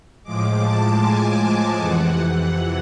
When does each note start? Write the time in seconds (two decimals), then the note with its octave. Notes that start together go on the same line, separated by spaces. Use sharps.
0.23 A2 F3 G#3 D6
0.62 A5
1.01 G#5
1.78 F2 C3 E3 F#5